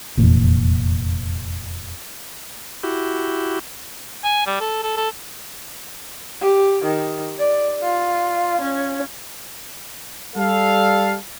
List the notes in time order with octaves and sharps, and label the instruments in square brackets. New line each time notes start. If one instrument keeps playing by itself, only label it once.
[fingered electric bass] F1 E2 A#2
[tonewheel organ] E4 F#4 G4
[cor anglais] G#5
G3
A4
A4
A4
[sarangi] G4
D#3
D5
F4
C#4
[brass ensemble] G3 A4 F5